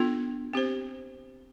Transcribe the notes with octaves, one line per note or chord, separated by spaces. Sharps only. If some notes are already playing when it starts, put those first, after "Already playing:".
Already playing: B3 D4 F4 A4
C4 G4 C5